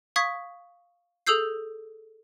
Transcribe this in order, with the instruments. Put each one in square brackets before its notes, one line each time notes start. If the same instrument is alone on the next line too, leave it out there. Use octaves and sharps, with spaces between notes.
[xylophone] F5 C#6 D#6 G#6 B6
G#4 A4 D#6 E6 G6 C7